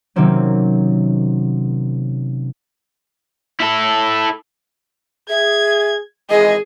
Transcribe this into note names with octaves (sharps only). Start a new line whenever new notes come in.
C3 D#3 F#3 A#3 C4 C#4
E4 A4
G#4 E5 G#6
G#1 E3 G#3 G#4 D#5